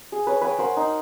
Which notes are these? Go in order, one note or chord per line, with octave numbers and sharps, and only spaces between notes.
G#4
B4 C#5
B4 C#5 G5 G#5
A#4 C5 F#5
D#4